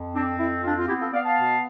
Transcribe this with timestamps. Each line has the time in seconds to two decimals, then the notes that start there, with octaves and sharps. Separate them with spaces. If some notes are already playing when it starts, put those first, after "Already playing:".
Already playing: F2
0.14 C4 D4
0.38 F2 E4
0.64 C4 D4 F4
0.79 F4
0.88 B3 E4 G4
1.01 F4 A4
1.13 B3 D5 F5
1.25 F5 A5
1.37 B2